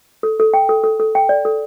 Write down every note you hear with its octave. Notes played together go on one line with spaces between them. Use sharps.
A4
A4
G5
A4
A4
A4
G5
D5
A4